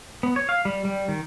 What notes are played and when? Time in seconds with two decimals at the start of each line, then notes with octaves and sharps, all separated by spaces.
0.23 B3
0.36 C#5
0.49 F5
0.65 G3
0.85 G3
1.08 D#3